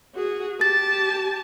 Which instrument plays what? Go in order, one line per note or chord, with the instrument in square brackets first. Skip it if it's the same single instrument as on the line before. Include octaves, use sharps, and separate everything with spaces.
[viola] F#4 G#4
[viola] G4 A5 [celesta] A6